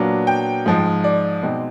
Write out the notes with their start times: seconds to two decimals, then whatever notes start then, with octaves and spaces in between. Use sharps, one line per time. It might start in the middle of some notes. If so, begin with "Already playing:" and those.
Already playing: A#2 F#3 B3 D4
0.27 G5
0.66 G#2 F3 G#3
1.04 D5
1.43 B2 G#3 C4 D#4